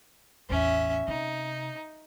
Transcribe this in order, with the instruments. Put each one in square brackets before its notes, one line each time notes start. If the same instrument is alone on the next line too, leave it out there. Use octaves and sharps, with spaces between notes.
[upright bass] A1 E2 [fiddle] C#4 E5
[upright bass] C3 [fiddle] D#4